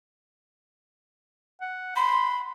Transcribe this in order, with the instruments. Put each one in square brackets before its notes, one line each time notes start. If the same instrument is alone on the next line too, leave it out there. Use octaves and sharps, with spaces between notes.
[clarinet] F#5
[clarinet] B5 [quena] C6